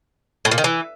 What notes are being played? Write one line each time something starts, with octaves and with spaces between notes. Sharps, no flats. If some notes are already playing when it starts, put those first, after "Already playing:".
A2
A#2
D#3
E3